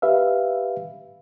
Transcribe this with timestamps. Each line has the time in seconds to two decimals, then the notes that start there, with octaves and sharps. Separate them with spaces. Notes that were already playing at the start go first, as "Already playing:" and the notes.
0.02 G4 B4 E5 F5